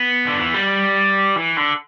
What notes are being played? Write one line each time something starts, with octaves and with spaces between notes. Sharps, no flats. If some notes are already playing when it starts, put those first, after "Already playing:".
Already playing: B3
D3
E3
G3
E3
D3